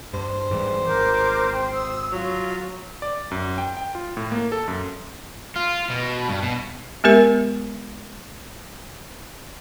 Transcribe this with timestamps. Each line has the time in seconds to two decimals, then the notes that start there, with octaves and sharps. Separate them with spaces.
0.13 G2 C5
0.51 G#2 E3 G3
0.86 G#1 A#4 D6 G6
1.53 G5
1.74 D#6 E6
2.12 F#3 F4
3.02 D5
3.31 F#2
3.58 G5
3.77 G5
3.95 F4
4.17 A2
4.32 A#3
4.52 A4
4.68 F#2
5.56 F4
5.90 B2
6.29 G2
6.43 B2
7.04 G#3 B3 G4 A#4 E5